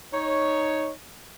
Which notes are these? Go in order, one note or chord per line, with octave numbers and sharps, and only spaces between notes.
D#4 C#5